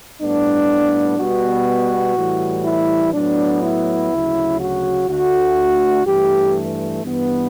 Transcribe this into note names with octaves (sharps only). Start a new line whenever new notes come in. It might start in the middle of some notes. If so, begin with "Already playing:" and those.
A2 G3 B3 D4
B2 G3 B3 F#4
A2 E3 G3
E4
A2 F#3 B3 D4
E4
D2 C#3 F#3
F#4
D2 D3 A3 F#4
G2 E3 A3 G4
G2 E3 B3